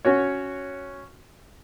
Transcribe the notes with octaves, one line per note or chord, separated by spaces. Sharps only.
C#4 F#4 C#5